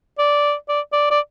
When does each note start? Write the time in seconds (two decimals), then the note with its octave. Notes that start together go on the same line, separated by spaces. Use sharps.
0.18 D5
0.68 D5
0.93 D5
1.11 D5